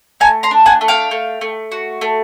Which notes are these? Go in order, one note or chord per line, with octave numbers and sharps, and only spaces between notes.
A3 G#5 A#5
A#5 C6
D4
F#5 G#5
A3
F5 G5
A3
A3
F#4
A3